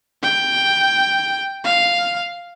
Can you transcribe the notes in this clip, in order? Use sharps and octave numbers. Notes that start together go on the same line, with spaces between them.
G5
F5